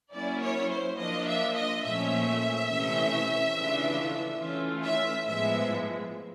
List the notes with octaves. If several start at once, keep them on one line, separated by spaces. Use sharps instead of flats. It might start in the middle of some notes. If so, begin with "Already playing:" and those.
F#3 A#3 C#4 E4 D5
C#5
C5
F3 A#3 D4 F4 D#5
E5
D#5
A#2 F3 A3 C#4 E5
C3 E3 A3 C#4
C#3 E3 A3 D4 F4
E3 A3 C#4 F4
E5
A2 F3 G#3 B3 E5